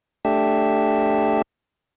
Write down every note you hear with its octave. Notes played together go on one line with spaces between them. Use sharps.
A3 D4 G4 E5